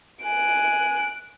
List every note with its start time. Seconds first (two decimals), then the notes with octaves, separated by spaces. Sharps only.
0.24 G#5 F#6 D7